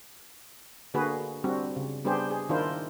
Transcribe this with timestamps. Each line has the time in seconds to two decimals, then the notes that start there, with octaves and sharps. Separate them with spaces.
0.94 D3 A#3 F#4 G#4 B4
1.44 G3 C4 D4 F#4
1.76 C#3
2.05 G3 B3 D4 G4 G#4 C5
2.30 G#4
2.49 D#3 D4 E4 F4 A#4 C5